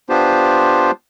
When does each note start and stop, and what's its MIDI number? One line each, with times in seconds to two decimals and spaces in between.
0.09 0.91 59
0.09 0.91 62
0.09 0.91 65
0.09 0.91 67
0.09 0.91 72